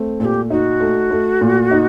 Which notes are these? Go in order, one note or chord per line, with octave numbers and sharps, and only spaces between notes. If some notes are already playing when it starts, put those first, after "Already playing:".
Already playing: A3 C4
A#2 G4 A4
D#4 F#4
A3
A3
A#2
D#4